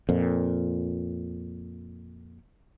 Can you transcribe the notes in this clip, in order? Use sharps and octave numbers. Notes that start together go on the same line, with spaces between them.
F2 A#2